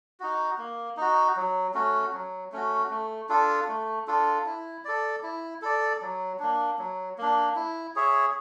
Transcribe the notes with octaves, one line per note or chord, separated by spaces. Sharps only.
D#4 F#4
A#3
D#4 F#4
F#3
A3 C#4 F#4
F#3
A3 C#4 F#4
A3
D4 F4 A4
A3
D4 F4 A4
E4
A4 D5
E4
A4 D5
F#3
A#3 D4
F#3
A#3 D4
E4
G#4 C#5 E5